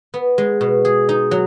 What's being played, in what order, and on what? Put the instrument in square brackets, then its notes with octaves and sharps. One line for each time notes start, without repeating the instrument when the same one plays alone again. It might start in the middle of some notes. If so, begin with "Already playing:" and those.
[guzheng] B3
G#3
B2
G#4
D#4
F#3